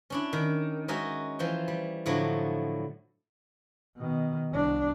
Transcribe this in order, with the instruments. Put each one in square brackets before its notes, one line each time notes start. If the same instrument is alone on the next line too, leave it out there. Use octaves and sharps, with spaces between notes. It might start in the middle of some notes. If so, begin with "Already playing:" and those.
[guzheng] C#4 D4 E4
D#3
G#3 C#4 D#4 F#4 E5 G#5
E3 F3 C5 G5
G3
A2 D3 F3 F#3 E4
[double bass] B2 D#3
C2 D4